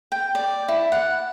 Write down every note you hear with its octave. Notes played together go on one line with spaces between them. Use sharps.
G5
D5
E4
F#5